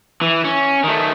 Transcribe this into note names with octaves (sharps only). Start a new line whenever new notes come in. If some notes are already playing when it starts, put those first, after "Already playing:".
E3
C#4
D#3 A3